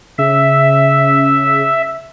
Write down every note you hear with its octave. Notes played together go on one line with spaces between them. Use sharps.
C#3 E5